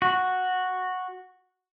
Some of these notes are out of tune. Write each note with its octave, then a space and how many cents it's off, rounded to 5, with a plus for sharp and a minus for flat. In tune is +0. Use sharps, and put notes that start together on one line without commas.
F#4 -5